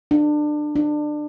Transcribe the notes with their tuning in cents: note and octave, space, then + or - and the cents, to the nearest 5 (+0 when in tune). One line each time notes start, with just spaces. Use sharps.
D4 +25
D4 +25